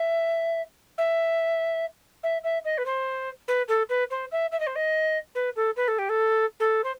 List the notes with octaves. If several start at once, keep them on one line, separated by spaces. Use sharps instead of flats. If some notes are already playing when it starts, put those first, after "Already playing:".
Already playing: E5
E5
E5
E5
D#5
B4
C5
B4
A4
B4
C5
E5
E5
D#5
C5
D#5
B4
A4
B4
A4
G4
A4
A4
C5